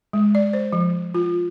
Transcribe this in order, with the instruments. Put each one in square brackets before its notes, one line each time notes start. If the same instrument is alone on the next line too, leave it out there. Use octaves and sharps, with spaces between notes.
[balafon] G#3
D5
C5
F3
F4